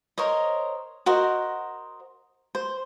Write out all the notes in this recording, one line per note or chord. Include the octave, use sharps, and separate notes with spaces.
A#4 C5 C#5 D#5
F#4 A#4 C5 D#5
C5